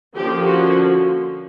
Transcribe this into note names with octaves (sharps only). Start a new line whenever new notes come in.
D3 F3 A#3 C#4 G4
F#4